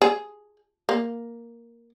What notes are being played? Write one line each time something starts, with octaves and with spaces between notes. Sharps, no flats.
G#4
A#3